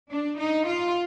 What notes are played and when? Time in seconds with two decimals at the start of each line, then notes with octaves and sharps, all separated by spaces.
0.11 D4
0.39 D#4
0.67 F4